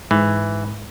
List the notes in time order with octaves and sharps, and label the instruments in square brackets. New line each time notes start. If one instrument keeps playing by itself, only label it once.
[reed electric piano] G#2 [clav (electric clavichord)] E3